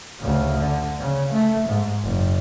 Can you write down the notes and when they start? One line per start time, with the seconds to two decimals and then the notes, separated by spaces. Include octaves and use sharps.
0.20 D2 C#3
0.58 D3
0.99 C#3
1.32 A3
1.68 G#2
2.03 F#1